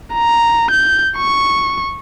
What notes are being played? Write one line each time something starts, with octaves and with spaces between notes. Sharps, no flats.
A#5
G6
C#6